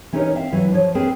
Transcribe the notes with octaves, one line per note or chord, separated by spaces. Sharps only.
E3 C#4 D#4 A4 A#4 C#5
C4 E5 F5
E3 F#3
F3 C#5
C4 G#4 A#4 B4